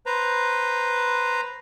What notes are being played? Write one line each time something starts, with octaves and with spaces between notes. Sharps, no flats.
B4 C5 A#5